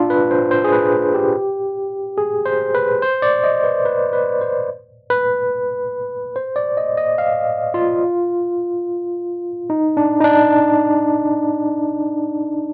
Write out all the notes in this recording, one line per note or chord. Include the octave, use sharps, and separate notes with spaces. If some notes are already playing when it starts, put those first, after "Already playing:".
Already playing: D4 F4
B4
C5
C5
G#4
B4
G#4
G4
G#4
C5
B4
C5
D5
D#5
B4
B4
B4
C5
B4
C5
D5
D#5
D#5
F5
F4
D#4
D4
D#4
D4